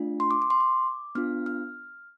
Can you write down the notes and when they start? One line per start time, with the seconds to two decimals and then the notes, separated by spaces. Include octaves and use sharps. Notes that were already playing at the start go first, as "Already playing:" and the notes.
Already playing: A3 D4 F4
0.20 C6
0.31 D6
0.42 D6
0.50 C6
0.60 D6
1.15 B3 D4 F4 F6
1.46 F6